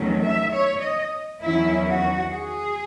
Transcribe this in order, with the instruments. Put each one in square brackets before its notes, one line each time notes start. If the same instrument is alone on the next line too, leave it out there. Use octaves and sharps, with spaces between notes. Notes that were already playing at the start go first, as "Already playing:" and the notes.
Already playing: [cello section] E2 D#3 F#3 A3 C#4
E5
C#5
D#5
E2 D#3 F#3 C#4 E4
F#4
G#4